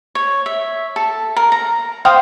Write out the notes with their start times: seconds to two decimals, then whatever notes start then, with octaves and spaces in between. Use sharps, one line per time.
0.15 C#5
0.46 E5
0.96 A4
1.36 A#4
1.52 A#5
2.05 C5 F5 G5 D#6